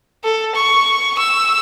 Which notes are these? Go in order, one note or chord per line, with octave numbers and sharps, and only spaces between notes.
A4
C#6
E6